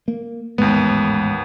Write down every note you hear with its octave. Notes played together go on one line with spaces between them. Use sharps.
A#3
A1 D#2 G#2 G#3 B3